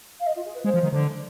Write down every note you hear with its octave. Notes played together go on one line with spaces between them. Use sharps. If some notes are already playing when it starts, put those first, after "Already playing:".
F5
D#5
F4
G#4
B4
G#3 C5
F3
D#3
D3